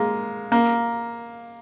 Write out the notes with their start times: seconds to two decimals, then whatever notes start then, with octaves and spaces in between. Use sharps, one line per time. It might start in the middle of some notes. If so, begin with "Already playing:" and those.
Already playing: G#3 A#3
0.52 A#3